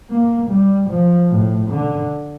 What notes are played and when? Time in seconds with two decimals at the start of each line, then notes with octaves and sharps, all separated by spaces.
0.10 A#3
0.50 G3
0.90 F3
1.31 A2
1.70 D3